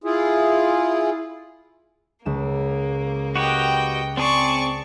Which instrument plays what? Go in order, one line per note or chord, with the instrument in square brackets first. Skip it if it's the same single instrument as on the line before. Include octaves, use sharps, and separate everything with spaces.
[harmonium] E4 F4 G#4
[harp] C#2 E7 [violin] A#3
[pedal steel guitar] F#4 G4 B4 [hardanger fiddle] D#5 G5
[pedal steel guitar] C4 G#4 C6 [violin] D5 C#6 [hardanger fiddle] A5